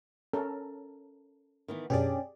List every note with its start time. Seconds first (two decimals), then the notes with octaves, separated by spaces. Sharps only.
0.33 C#4 A4 A#4
1.68 D#3 E3 B3
1.90 F#2 B2 C#4 D4 G4 G#4 D5